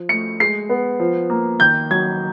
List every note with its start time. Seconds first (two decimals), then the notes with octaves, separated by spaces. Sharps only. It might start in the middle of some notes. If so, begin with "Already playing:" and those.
Already playing: F3
0.09 A3 C#7
0.40 G#3 C7
0.69 B3
1.00 F3
1.30 A#3
1.60 D#3 G6
1.91 F#3 G#6